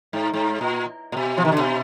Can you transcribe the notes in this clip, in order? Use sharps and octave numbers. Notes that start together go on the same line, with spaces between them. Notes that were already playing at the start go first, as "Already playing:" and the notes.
G#2
G#2
A#2
A#2
B2
F3
D#3
D3
B2